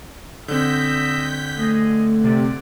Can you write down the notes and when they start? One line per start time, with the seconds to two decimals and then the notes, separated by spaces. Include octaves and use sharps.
0.48 D3 C4 D#5 E5 G6 B6
1.58 A3 G#4 D#5
2.24 C3 D5